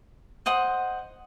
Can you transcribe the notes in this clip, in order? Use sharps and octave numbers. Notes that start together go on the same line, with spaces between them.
C5 D#5 F#5 D#6